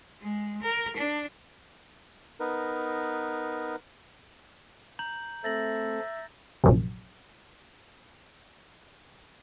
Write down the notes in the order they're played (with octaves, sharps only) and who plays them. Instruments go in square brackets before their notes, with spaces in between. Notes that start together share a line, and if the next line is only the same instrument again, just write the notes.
[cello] G#3
A#4
D4
[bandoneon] B3 D#4 A#4 B4
[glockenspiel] A#5 G6 F#7
[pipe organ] A3 C4 A4 [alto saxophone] E5 [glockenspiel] A6 A#6 F#7
[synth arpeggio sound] A#1 F#2 C3